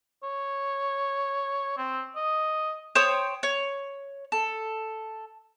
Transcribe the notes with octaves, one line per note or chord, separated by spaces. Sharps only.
C#5
C4
D#5
C5 C#5 G5 D#6
C#5
A4